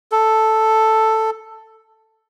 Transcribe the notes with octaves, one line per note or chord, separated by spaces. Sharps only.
A4